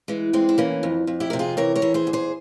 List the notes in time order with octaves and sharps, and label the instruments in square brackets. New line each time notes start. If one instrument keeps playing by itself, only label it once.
[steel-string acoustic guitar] E3 G#3
E2 G#3 C4
E4
E3 A#3 C#4
F2
F2
E4 G4
C3 A#4
F4 G#4
E3 A#4 C#5
A#4 C#5
E3
G#4 C5
E2
G#4 C5